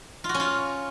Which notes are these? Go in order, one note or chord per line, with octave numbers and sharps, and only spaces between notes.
F4
F#4
C#4
F4